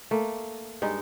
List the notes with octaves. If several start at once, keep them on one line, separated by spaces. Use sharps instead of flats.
A3 A#3
G2 G#3 D#4